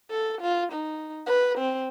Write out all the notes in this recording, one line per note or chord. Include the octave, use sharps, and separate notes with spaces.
A4
F4
D#4
B4
C4